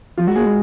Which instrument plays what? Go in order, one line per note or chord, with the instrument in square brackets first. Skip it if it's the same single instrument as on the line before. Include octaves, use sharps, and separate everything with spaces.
[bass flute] F3 [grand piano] F4
[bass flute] G#3 [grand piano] F#4
[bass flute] A#3 [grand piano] G#4
[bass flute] G#3